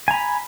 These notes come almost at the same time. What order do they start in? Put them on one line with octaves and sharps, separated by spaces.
G#5 A#5 B5